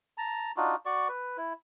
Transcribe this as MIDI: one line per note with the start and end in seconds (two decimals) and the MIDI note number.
0.18 0.52 81
0.18 0.52 82
0.57 0.76 62
0.57 0.76 63
0.57 0.76 65
0.57 0.76 66
0.86 1.08 66
0.86 1.08 74
0.86 1.08 85
1.08 1.37 71
1.37 1.53 64